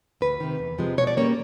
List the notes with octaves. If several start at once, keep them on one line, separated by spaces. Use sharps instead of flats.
D2 B4
C3 D#3
E2
C3 F3 G#3
B2 C#5
D5
G3 A#3 C#4 C#5